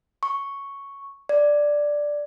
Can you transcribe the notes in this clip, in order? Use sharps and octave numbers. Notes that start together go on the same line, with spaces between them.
C#6
D5